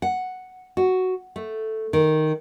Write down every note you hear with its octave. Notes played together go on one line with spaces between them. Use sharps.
F#5
F#4
A3
D#3